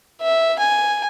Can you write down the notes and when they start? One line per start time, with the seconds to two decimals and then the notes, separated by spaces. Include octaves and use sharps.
0.22 E5
0.59 G#5